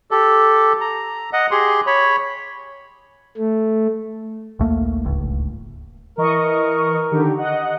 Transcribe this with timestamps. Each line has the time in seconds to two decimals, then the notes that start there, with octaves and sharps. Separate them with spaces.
0.11 G4 A4
0.81 A#5
1.33 D#5 F#5
1.51 G4 G#4 C6
1.87 C#5 B5
3.38 A3
4.59 A#1 D#2 A3 A#3
5.05 D1 G#1 C#2
6.18 E3 A#4 D#5 C#6
7.11 D3 D#3 G4
7.38 D#5 F#5